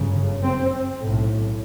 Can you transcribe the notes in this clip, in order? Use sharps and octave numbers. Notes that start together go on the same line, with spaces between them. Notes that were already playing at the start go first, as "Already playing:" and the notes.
Already playing: G1 F#2 C#3
C4
B1 A2